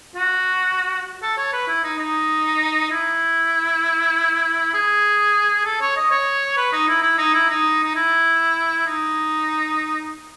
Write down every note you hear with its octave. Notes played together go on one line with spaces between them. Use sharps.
F#4
A4
C#5
B4
E4
D#4
D#4
E4
G#4
A4
C#5
D#5
C#5
B4
D#4
E4
E4
D#4
E4
D#4
D#4
E4
D#4